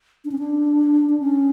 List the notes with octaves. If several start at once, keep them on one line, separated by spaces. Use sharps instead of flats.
D4
C#4
D4
D4
C#4